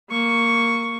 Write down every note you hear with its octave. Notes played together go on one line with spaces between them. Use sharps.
A#3 C#6